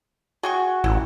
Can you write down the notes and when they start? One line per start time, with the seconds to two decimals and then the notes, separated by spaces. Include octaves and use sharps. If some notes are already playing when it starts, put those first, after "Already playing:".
0.43 F#4 G#4 G5 C#6
0.84 A1 E4